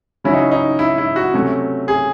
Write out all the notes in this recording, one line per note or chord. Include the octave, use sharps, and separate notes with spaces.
C#3 F#3 C#4 E4
D#4
D#4
E4
E4
F#4
C3 F#3 A3 C#4
G#4